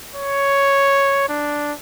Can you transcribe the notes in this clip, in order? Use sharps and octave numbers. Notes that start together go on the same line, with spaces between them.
C#5
D4